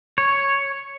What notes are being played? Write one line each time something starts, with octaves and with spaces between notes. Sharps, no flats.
C#5